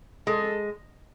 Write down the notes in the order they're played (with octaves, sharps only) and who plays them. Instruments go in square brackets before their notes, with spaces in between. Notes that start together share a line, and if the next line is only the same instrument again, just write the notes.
[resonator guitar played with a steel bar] G#3 [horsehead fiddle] A4